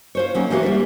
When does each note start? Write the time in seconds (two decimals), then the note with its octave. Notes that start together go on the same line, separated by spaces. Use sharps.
0.15 F4 C5 C#5
0.35 F#3 A#3 C#4 D#4
0.50 C3 E3 G#3 A#3 F#4 F#5
0.63 G3 D5 E5